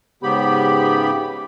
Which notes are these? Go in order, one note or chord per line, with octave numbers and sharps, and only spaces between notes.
G#2 C#3 B3 G4 B5